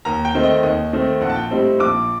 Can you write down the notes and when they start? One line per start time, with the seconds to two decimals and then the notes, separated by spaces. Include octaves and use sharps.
0.05 D#2 A#5
0.25 G5
0.35 D#3 A3 C4 D#4
0.43 D#5
0.63 D#2 D#5
0.93 D#3 A3 C4 D#4
1.21 A#1 F#5
1.30 A5
1.36 G5
1.51 A2 G3 C4 D#4
1.79 A#1 D6